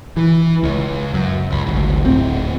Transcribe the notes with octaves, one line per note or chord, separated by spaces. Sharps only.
E3
C#2
F#2
C#2
G#1 D2
D1 A2 C4